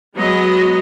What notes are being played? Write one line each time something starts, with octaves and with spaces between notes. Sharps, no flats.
F#3 G#3 B3 D#5